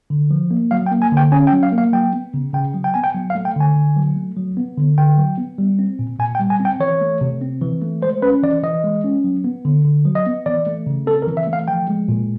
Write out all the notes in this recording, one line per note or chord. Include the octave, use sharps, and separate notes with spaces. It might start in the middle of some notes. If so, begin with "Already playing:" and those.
D3
F3
A#3
F#3 F5
G5
A#3
G#5
D3
G5
C#4 G#5
G5
F#3
F5
A#3
F5
F#3 G5
B3
C#3
C#3 G5
F#3
G5
B3 G#5
G5
F#3
F5
A3
G5
D3 G#5
D3
F#3
A3
F#3
B3
D3
D3 G5
F#3
B3
G3
C4
A#2
A#2 G#5
G5
G3
G#5
C4
G5
E3 C#5
A3
C3
C4
E3
A3
G#3 C5
C#4 B4
E3 D5
E3 D#5
G#3
C#4
F#3
B3
D3
D3
F#3
D#5
B3
E3 D5
A3
C#3
C4 A4
A#4
E3
E5
A3
F5
F3 G5
G#3
A#2